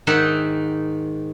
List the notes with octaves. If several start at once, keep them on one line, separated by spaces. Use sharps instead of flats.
G#2 D#3 D#4 E5 F#5 G5